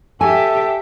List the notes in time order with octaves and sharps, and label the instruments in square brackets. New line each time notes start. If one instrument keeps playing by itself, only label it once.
[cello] G4 E5 [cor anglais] A4 [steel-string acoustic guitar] G#5